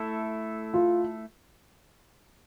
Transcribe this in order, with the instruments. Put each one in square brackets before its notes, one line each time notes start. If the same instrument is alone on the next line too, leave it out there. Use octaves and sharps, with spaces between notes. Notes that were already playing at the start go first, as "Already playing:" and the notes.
Already playing: [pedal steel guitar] A3 E4 A4
[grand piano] F4